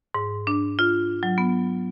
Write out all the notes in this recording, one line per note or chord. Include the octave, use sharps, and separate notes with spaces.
G#2
D4
F4
F#3
B3